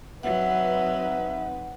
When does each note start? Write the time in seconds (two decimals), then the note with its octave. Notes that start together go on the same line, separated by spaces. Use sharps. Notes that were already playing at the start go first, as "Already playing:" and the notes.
0.23 F#3 C4 D#4 B4 E5 F#5